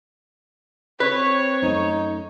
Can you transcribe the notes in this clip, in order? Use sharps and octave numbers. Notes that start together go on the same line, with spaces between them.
C4 B4 C#5
F#2 A3 D#4